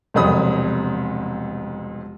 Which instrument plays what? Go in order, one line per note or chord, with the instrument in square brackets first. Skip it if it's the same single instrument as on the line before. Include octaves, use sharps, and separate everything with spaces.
[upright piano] E1 C2 F2 B5 D#6